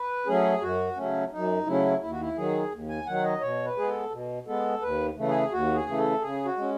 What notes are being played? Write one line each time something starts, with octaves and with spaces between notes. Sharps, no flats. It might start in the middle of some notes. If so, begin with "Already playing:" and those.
Already playing: B4
F#3 A3 C#4 G#4
F#2 F#4
C#3 F#3 A3 C#4
F#2 D#4
C#3 F#3 A3 C#4 E4
D#2 E4
F#4
E4
D#3 F#3 G#4
D#2
G#5
D#3 F#3 F#5
D#5
B2 C#5
B4
G#3 B3 G#4
A4
B2
G#3 B3 A4
D#2 B4
C#3 E3 A3
G#4
D#2 F#4
G#4
C#3 E3 A3
A4
C#3 G#4
F#4
G#3 C#4